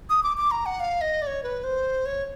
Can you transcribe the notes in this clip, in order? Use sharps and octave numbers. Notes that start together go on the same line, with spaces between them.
D#6
D6
D6
A#5
F#5
F5
D#5
D5
C#5
B4
C5
C#5